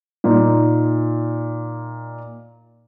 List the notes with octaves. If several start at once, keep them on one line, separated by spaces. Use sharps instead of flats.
A#2 D#4